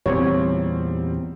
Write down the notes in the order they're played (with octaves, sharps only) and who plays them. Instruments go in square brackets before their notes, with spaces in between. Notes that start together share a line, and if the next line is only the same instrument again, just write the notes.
[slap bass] E2 A#2 C#3 [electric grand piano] G3 C4 [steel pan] C#5